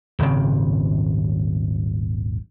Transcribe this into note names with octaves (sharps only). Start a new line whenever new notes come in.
D#1 G#1 C#3 C4